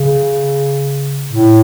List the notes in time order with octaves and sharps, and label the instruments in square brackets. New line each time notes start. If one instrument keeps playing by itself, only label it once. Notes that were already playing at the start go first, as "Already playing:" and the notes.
Already playing: [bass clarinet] C#3
A2